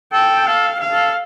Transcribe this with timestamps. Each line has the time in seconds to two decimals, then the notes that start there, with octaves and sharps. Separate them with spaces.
0.13 A4 G5
0.46 A4 F5
0.80 F5
0.91 A4